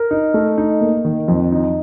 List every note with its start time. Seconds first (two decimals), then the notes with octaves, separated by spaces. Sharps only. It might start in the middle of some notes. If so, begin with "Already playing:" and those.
Already playing: A#4
0.11 D#4
0.34 A3
0.58 D#4
0.81 A#3
1.05 D#3
1.28 F2
1.52 D#4